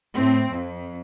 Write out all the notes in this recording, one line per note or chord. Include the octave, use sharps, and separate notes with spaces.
A2 C4
F2